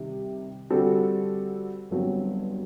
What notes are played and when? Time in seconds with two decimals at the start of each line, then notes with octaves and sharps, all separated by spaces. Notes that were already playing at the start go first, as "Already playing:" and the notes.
Already playing: C3 D#3 G3
0.70 D3 G3 C4 F#4 A4
1.90 G1 G2 F#3 C4